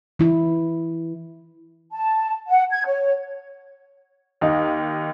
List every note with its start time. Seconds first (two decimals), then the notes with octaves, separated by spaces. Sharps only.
0.19 E3 E4
1.93 A5
2.49 F#5
2.71 G#6
2.87 C#5
4.41 D#2 D#4